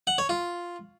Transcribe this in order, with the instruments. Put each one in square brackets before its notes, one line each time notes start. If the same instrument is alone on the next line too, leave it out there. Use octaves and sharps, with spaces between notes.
[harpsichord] F#5
C#5
F4